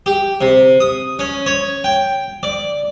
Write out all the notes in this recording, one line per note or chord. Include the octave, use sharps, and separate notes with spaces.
G4
C3
D#6
C#4
C#5
G5
D5